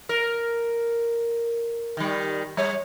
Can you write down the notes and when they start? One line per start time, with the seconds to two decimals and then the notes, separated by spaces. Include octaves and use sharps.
0.09 A#4
1.97 D#3 G3
2.57 G3 C#5